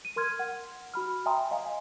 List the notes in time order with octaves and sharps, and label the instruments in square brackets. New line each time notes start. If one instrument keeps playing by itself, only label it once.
[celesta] D#7
A#4 C6 F6 G#6
F#5
F#4 B5 F6
E5 G5 G#5 A#5 C6 D#6
D#5 F5 G#5